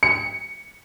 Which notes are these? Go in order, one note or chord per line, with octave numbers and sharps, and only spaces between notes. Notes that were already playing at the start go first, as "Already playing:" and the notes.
C#7